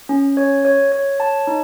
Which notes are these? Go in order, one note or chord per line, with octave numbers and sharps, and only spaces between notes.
C#4
C#5
C#5
C#5
A5
D#4